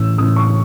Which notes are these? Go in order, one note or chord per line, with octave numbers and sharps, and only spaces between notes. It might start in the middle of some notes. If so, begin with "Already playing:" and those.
Already playing: A1 A2 E3 E6
A1 A2 E3 D#6
C#6